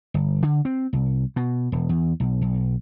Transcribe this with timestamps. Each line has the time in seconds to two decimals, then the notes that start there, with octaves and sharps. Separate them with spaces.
0.14 G1
0.42 D3
0.65 C4
0.93 C2
1.36 B2
1.72 E1
1.89 E2
2.20 B1
2.42 B1